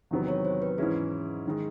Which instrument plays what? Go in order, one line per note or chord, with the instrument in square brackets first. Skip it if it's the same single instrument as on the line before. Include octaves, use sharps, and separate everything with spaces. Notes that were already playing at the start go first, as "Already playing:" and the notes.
[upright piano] E2 C3 D#3 F#3 B3
[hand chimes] C#5
C5
B4
[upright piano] G#2 E3 G#3 C#4 E4 [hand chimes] G#4
[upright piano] D#3 G#3